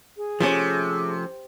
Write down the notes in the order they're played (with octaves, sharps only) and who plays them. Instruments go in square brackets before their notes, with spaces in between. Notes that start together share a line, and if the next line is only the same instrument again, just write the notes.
[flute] G#4
[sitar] C3 [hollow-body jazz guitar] F3 A3 C#4